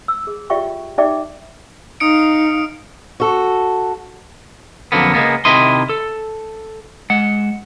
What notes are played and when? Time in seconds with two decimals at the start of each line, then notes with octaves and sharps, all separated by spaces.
0.08 E6
0.27 G#4
0.50 F4 G4 D5 E5 G5 C#6
0.98 D#4 G4 D5 E5 G5 D6
2.00 D#4 F5 D#6 C#7 D7
3.20 F#4 A4
4.92 F2 G#2 D3 F#3 A#3 B3
5.14 C#2 G#3 A#3 B3
5.45 C3 D#3 E4 D#5 C6
5.89 A4
7.10 G#3 F#5